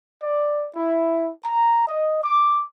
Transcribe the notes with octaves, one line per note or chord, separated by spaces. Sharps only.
D5
E4
A#5
D#5
D6